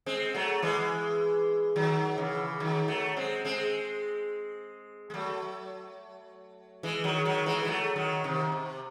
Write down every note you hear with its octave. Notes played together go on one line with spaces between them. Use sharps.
G#3 C4
F#3 A3
E3 G#3
D#3 F#3
C#3 E3
D#3 F#3
F#3 A3
G#3 C4
G#3 C4
G#3
F#3 A3
E3 G#3
D#3 F#3
D#3 F#3
E3 G#3
G#3
F#3 A3
D#3 F#3
C3 D#3
C3